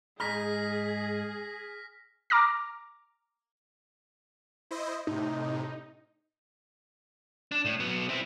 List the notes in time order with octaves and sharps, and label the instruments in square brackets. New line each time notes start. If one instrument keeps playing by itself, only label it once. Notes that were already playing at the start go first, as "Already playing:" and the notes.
[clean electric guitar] G#2 D#4 A#5 [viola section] G#4 [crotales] F6 A#6 B6
[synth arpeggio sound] A#5 D6 F6 A#6
[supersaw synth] E4 C5 D#5
[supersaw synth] A2 C3 [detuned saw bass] D#4
[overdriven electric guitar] D4
A2
F#3 B3
C4 E4